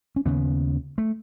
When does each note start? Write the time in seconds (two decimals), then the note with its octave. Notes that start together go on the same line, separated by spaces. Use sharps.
0.16 C#4
0.26 D#2 C#3 B3
0.98 A3